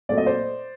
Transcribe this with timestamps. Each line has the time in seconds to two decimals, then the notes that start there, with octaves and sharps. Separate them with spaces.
0.09 A#2 F#3 A3 C4 D5
0.17 D#5
0.26 C5 D5